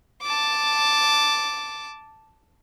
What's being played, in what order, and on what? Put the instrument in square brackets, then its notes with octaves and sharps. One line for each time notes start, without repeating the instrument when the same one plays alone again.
[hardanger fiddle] A5 D6